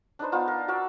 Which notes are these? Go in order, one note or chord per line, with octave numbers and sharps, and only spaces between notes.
D4 D#4 B4 C5
B3 D4 D#4 F4
A#4
F#4 A#4 D5 E5